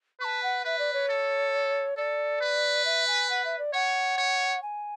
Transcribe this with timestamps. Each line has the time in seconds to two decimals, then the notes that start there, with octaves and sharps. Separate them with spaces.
0.20 B4 C#6
0.24 A5
0.43 F#5
0.65 B4 E5
0.79 D5
0.93 C#5
1.09 A4
1.97 A4 D5
2.41 B4
2.85 E5
3.07 G#5
3.30 F#5
3.45 E5
3.59 D5
3.73 C#5 F#5
4.18 C#5
4.62 G#5